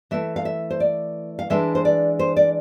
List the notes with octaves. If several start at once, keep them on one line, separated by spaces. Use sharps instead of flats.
E3 A3 E4 E5
F5
E5
C5
D5
F5
E3 G#3 D4 E5
C5
D5
C5
D5